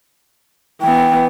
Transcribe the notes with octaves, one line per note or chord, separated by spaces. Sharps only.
E3 B3 G5